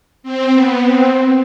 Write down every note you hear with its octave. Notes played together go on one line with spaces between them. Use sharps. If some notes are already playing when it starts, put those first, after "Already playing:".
C4
B3
C4